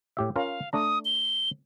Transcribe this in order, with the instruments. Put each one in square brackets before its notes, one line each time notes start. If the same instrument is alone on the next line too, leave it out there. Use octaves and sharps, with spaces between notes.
[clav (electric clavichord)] A2 G4 E5
[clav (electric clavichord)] C#4 F4 A#4 [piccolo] F5
[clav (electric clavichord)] A3 D4 A#5 [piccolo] D#6
[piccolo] G7